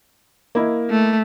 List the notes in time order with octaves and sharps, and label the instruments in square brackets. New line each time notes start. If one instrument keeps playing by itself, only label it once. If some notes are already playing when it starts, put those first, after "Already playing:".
[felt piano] A#3 E4 D#5
[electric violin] A3